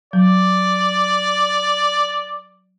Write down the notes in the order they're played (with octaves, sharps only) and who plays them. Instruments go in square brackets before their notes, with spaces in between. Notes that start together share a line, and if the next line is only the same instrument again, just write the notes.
[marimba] F#3 [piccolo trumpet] D5